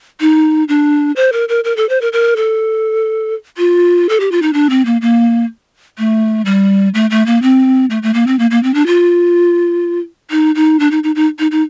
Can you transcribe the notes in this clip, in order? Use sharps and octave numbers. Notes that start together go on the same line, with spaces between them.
D#4
D4
C5
A#4
A#4
A#4
A4
C5
A#4
A#4
A4
F4
A4
G4
F4
D#4
D4
C4
A#3
A#3
A3
G3
A3
A3
A#3
C4
A3
A3
A#3
C4
A#3
A#3
C4
D4
F4
D#4
D#4
D4
D#4
D#4
D#4
D#4
D#4